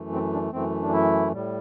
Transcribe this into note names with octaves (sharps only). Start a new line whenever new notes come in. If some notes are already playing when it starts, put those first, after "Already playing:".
Already playing: F#2 E3 A3
C4
D4
F#2 E3 A3 C4
D4
E4
A2 G3